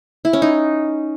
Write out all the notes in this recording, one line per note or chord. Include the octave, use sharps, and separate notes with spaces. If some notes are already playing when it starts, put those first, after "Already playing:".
E4
C#4
D#4